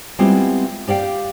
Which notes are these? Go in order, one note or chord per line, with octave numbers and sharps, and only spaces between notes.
G3 G#3 B3 C4 E4 F4
G4 D5 F5 G5